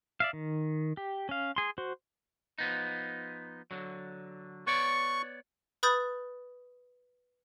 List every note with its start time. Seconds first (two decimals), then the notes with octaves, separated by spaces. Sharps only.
0.20 D5 E5 F5
0.33 D#3
0.97 G4
1.29 C#4 F5
1.56 G#4 C6
1.78 F#4 C5
2.58 F3 B3 D#4
3.71 D3 F#3
4.67 B3 C#5 D5 C#6
5.83 B4 B5 D#6 G6 A6